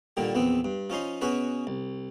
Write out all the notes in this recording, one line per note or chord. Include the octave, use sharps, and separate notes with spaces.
A#2 D3 D#3 G3
A#1 E2 B3 C4
G2
F3 C#4 D#4 C6
B2 C#4 F#4 G#4 B4
C2